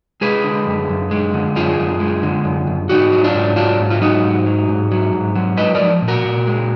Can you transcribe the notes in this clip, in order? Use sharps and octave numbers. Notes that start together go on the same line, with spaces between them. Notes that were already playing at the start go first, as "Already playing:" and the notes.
G#3 G#4 B4
D3
F#2
F#2
G#3
D3
F#2 F4 G#4
F#2
G#3
D3
F#2
F#2
G#2 D#4 F#4
F#3
D4 F4
G#2
F#3 D4 F4
G#2
F4
F#3 D#4 F#4
G#2
F#3
G#2
F#3
G#2
F#3
G#3 B4 D#5
A#4 D5
F3
A#2
F#4 A#4
A#2
G#3